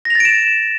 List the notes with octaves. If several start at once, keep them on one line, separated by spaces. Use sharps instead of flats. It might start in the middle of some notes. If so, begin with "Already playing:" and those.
A6 A#6 D7 E7 F7